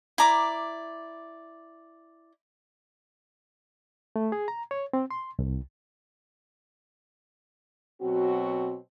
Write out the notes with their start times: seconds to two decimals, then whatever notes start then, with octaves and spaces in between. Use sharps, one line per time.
0.18 E4 D5 A#5 D6
4.16 A3
4.32 G#4
4.48 A#5
4.71 C#5
4.93 C4
5.11 C6
5.39 C2
8.01 B2 F#3 C4 F#4